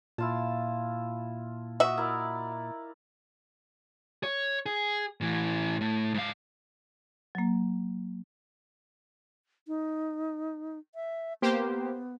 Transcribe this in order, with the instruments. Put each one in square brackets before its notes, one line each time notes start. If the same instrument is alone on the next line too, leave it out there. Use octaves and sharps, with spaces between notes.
[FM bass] A#2 [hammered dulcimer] E4 F4 A5
[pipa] F#4 E5 [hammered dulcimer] D#5
[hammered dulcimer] E4 A#4 D5
[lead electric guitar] C#5
G#4
A2 E3
A2
G#2 F5
[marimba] F#3 A#3
[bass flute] D#4
E5
[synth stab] A#3 G4 C5 [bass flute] B3